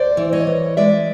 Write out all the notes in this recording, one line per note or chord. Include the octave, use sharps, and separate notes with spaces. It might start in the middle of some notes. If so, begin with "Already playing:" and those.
Already playing: D2 C5 D5
E3
C#5 D#5
E3
G#3 D5 E5